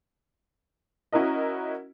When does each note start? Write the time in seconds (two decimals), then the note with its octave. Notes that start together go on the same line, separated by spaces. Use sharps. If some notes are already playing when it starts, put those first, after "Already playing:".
1.12 C#4 E4 F#4 A#4 D#5